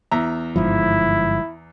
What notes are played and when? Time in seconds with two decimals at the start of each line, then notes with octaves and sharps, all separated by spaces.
0.11 E2 E5 A#5
0.56 G1 G#2 F3 E4